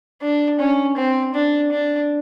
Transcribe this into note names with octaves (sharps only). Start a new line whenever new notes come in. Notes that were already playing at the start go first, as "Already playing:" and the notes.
D4
C#4
C4
D4
D4